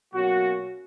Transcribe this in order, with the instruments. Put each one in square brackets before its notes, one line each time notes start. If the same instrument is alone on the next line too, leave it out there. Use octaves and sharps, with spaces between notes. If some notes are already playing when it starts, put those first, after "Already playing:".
[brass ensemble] B2 F#3 A#3 C#4 F#4